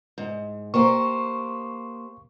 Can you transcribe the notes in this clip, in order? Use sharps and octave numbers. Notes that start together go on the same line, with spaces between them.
G#2
A#3 G4 C5 C#6